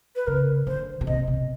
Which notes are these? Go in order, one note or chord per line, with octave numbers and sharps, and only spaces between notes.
B4
C#3 A#4
D3 C5
B2
C3 D#5
B2